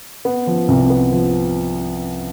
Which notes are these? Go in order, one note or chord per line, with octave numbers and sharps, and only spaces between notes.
B3
F3
C2
B3
F3